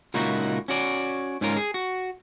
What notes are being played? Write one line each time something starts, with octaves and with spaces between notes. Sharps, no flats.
C#2 A#2 A#3 D#4 E4 F#4
C#4 F#4 D5
G#2 C#4 F4 A#4
G#4
F#4